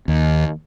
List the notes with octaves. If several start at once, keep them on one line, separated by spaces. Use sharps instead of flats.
D#2